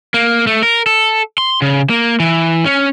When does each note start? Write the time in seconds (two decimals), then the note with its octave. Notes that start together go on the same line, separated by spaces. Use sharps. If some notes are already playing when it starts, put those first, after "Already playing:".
0.14 A#3
0.47 A3
0.63 A#4
0.86 A4
1.38 C6
1.62 C#3
1.90 A#3
2.20 E3
2.66 C#4